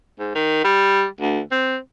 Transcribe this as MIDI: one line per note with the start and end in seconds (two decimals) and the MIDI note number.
0.19 0.34 44
0.35 0.62 51
0.64 1.06 55
1.21 1.40 38
1.51 1.77 60